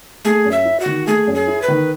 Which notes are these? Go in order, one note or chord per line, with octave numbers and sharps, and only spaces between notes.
A3 G#4
F#2
E5
E4
F#4
D#3
A3 G#4
F#2
G#4
E4
B4
D#3